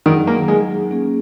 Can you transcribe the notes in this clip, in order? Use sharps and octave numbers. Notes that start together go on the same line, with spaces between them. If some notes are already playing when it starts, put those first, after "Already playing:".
D#3 F#3 D#4 G#4 F#5
A#3
G#3
A#3 C#4 G#4